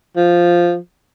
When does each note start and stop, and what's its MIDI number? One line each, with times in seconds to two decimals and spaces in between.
0.16 0.76 53